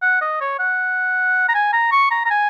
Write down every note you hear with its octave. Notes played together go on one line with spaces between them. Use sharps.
F#5
D#5
C#5
F#5
A#5
G#5
A#5
C#6
A#5
A#5
G#5